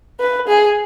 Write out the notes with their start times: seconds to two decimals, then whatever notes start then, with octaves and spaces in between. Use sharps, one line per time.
0.20 B4
0.48 G#4